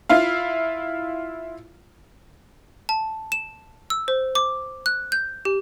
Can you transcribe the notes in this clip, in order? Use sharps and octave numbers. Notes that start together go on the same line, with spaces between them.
E4 F4 F5
A5
E7
E6
C5
D6
F#6
G6
G4